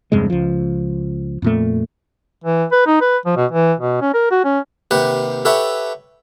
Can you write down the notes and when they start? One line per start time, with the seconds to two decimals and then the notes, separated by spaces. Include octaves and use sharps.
0.12 E2 G2 C3 G#3
0.30 C#2 F3
1.42 F2 A#2 A3
2.44 E3
2.72 B4
2.87 D#4
3.01 B4
3.26 F3
3.37 B2
3.52 E3
3.80 B2
4.02 C#4
4.14 A#4
4.31 F#4
4.44 C#4
4.91 D#2 C3 G4 B4 F#5
5.45 G4 A4 B4 C#5 E5 F#5